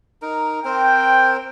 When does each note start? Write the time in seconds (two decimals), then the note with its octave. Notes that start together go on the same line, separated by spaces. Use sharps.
0.22 D#4 A#4
0.65 C4 A#4 C5 G5